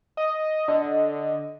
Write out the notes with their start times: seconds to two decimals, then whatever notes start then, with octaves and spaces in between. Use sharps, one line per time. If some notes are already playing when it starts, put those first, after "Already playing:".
0.17 D#5
0.68 D3 D#5